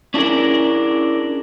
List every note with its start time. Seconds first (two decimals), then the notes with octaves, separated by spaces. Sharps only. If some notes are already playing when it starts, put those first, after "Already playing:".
0.14 C#4 D4 E4 G#4 A#4